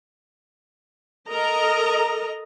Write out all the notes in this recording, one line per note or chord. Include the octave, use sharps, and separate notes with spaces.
A4 A#4 D#5 A#5